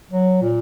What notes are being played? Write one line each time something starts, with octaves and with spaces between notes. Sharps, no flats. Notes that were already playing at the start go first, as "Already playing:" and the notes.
F#3
A#2